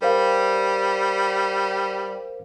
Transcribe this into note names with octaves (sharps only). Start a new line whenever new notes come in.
G3 A#4 C5 F5